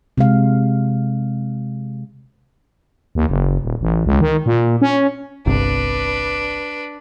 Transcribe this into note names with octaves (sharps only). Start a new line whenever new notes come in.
C3 G#3 F5
D#2
F#1
D#1
A1
C#2
D#3
A#2
C#4
G1 C2 C3 D4 B4